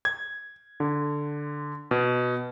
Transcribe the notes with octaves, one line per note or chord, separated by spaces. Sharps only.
G#6
D3
B2